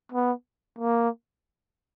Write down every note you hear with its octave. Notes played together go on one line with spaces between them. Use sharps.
B3
A#3